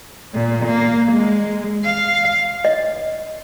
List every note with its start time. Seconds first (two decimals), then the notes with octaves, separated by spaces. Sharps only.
0.34 A#2
0.66 A#3
1.12 G#3
1.84 F5
2.65 D#5